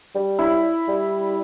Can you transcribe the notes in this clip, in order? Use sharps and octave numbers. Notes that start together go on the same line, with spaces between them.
G3
E4
G3